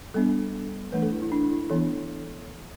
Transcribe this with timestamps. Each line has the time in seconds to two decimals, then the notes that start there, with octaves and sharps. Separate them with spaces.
0.14 G3 B3 D4 A4
0.92 E3 A3 D4 B4
1.02 A4
1.12 E4
1.22 E4
1.32 D4
1.51 E4
1.70 E3 B3 D4 A4